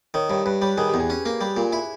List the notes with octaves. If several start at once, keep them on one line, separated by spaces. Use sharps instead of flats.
D#3 C#5
G2 C#5
G2 B4
G3 C#5
D#3 G#4
E2 G4
G#4
C#4
A#3
G3
A#2
E4